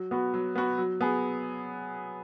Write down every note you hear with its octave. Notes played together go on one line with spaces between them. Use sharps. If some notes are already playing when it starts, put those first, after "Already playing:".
Already playing: F#3
B3 F#4
F#3
B3 F#4
F#3
B3 G#4